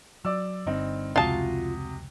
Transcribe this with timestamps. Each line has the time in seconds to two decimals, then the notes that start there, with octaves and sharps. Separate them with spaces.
0.25 F#3 D5 D6 E6
0.66 G1 G2 C4 D#4
1.16 F1 C#2 C3 F4 F#4 A5 D#6